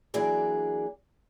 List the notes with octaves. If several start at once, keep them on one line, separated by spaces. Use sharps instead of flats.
E3 F#3 A#3 D4 G#4 D5